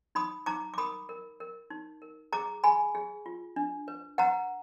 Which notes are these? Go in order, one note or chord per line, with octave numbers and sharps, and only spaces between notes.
D#4 B5 D#6
D#4 A#5 D6
D6
A#4 B5 D#6
A#4
A#4
D#4
A#4
G#4 A#5 D6
G#4 G#5 B5
G#4
F4
D4
B4
B4 F#5 A#5